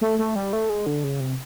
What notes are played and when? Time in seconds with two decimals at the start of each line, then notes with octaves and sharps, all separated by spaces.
0.01 A3
0.19 A3
0.36 G3
0.53 A3
0.70 G#3
0.86 D3
1.04 C#3
1.20 C3